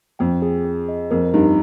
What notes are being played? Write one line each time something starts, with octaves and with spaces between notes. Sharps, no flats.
F2 G5
G#4
G#4
D#5
F2 A#4
G2 D#4